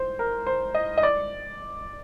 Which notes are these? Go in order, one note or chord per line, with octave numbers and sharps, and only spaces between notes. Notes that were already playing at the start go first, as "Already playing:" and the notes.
Already playing: C5
A#4
C5
D#5
D#5
D5